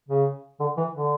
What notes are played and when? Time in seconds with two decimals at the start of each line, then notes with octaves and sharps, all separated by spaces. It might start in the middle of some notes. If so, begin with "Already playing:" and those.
0.09 C#3
0.60 D3
0.77 E3
0.95 D3